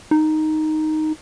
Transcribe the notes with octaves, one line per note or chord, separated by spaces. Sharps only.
D#4